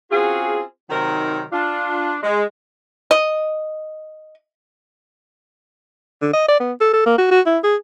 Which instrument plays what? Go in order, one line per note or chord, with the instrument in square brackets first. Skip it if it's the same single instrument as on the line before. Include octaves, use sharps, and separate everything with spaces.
[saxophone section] C4 C#4 F4 F#4 G#4
C3 D#3 F#3 C4 D#4 A#4
D4 F4
G#3
[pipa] D#5
[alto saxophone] D3
D#5
D5
B3
A4
A4
A#3
F#4
F#4
E4
G#4